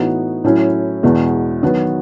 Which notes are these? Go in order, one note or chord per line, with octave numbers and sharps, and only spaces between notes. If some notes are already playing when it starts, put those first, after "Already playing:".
Already playing: A2 E3 B3 D#4 F#4
A2 F#3 C#4 E4
E2 B2 G#3 B3
D#3 F#3 B3 F#4